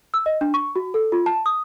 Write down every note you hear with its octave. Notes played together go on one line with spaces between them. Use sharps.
E6
D#5
D4
C#6
F#4
A4
F4
A5
D#6